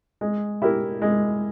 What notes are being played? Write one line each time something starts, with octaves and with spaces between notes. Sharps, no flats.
G#3
E4 G4 A#4
G#3